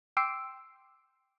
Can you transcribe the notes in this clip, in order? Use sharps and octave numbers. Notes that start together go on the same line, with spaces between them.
G5 C6 D6 E6 C7 D7